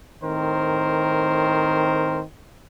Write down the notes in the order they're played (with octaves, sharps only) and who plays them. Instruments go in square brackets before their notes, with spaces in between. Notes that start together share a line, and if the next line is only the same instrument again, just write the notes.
[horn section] A2 D#3 C4 A#4 C5